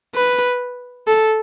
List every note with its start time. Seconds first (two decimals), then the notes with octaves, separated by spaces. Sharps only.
0.15 B4
1.08 A4